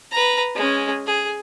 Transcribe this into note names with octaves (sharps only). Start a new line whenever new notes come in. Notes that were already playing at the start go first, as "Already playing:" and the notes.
B4 A#5
G#3 C#4
G#4